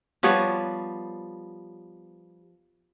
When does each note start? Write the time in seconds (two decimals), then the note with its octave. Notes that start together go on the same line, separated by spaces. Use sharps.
0.23 F3 G3 B3 C#5